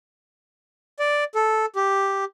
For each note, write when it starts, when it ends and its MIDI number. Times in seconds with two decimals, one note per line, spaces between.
0.99 1.24 74
1.35 1.66 69
1.76 2.24 67